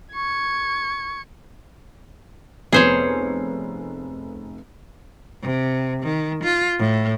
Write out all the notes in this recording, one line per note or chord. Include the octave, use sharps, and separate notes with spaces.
C#6 G#6 C#7
F1 B3 G#4 C5 C#5 C7
C3
D#3
F4
A2